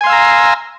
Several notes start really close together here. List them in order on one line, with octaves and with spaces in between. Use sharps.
G#5 C6 F5 E6 A#5